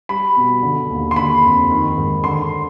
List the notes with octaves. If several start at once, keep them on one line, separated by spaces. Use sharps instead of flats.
G3 B5
B2
D3
D#2
C6
D3 B5
F2
D#3
G#2
D3 C6